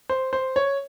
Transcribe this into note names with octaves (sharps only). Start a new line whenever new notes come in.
C5
C5
C#5